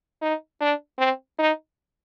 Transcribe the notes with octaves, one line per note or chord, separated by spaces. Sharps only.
D#4
D4
C4
D#4